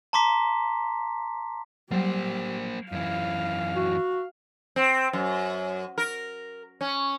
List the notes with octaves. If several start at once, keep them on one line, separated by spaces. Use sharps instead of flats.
A5 A#5 C6 D6 B6
F#3 G3 A#3 G4 C5
F#2 E3 F5
F#4
C4
F#2
A#4
C#4